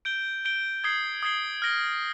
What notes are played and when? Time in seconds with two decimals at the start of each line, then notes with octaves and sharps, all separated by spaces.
0.05 G6 D7 G7
0.45 G6 D7 G7
0.84 D#6 G#6 C7 G7
1.23 D#6 G#6 C7 G7
1.62 F6 A#6 D7 G7